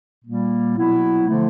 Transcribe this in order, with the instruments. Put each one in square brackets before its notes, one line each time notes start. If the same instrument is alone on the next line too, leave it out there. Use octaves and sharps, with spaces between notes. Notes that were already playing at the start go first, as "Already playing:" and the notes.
[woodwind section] A#2 G3 A#3
B2 F#3 B3 E4
D3 F3 A3